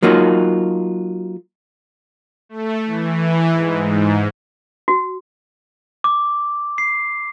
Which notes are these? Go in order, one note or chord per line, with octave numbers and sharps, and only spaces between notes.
F#3 A#3 D#4 F4 F#4
A3
E3
G#2
F#4
D6
C7